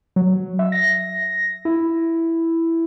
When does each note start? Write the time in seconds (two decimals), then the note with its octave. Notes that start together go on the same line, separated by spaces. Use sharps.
0.16 F#3
0.59 E5
0.72 A#6
1.65 E4